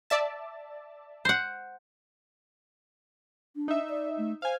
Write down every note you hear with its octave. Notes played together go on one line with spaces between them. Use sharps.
D5 E5 A5
C5 F#5
D4
D#4 E5
D5
A3
C5 F5 G#5